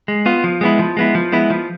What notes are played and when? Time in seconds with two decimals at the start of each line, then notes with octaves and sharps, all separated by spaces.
0.08 G#3
0.26 B3 F4
0.44 F3
0.61 G#3 B3 E4
0.79 F3
0.97 G#3 B3 E4
1.15 F3
1.32 G#3 B3 E4
1.50 F3